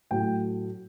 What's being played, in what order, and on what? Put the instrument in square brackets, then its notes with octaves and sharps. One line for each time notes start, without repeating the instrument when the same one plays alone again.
[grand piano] A2 F#3 A3 G5